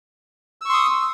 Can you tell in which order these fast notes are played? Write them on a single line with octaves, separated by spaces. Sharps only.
E6 C#6 C6 D#6